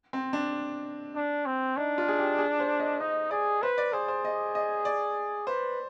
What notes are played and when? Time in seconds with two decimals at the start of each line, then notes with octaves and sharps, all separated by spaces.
0.13 C4
0.33 D4
1.15 D4
1.46 C4
1.77 D4 D#4
1.98 F4
2.08 G#4
2.19 G4
2.38 G#4
2.60 C5
2.80 D#5
3.00 D#4 D#5
3.31 G#4 D5
3.62 B4 C5
3.78 D5
3.93 G#4 C5
4.08 C5
4.25 D#5
4.55 D#5
4.85 D5
5.47 B4 C5